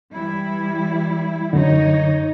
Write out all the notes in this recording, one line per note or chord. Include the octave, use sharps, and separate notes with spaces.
E3 G3 E4
F#2 D3 D#4 C#5